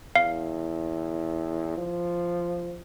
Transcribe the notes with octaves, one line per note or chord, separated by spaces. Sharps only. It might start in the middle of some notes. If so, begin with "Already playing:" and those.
E2 F5
F3